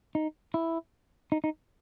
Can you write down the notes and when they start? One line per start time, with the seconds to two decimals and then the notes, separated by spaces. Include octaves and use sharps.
0.15 D#4
0.54 E4
1.32 D#4
1.44 D#4